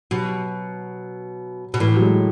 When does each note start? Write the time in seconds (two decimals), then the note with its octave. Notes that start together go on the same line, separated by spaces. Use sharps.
0.11 B2 F#3
1.74 B2
1.80 A2 E3
1.96 F#3
2.01 G#3